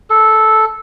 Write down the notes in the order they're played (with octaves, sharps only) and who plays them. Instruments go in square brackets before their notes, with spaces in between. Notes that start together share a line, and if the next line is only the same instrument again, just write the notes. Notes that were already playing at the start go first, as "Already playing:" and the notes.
[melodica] A4